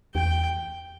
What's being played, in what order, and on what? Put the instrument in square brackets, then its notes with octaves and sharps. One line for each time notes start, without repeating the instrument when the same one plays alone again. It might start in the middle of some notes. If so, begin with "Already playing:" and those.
[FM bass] E2 [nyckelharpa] G5